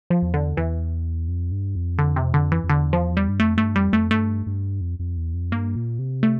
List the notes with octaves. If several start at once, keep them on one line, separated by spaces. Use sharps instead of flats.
F3
E2
D3
E2 E3
F2
G2
F2
D3
C3
D3
E3
F2
E2 D3
F3
G3
G2
F2 A3
G2 A3
F2 G3
F2 A3
G2 A3
G2
F2
F2
E2
F2
G2 A#3
A#2
C3
A3